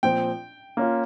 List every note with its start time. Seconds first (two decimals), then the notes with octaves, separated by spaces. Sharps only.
0.03 A#2 F3 C4 G5
0.77 A#3 C#4 F4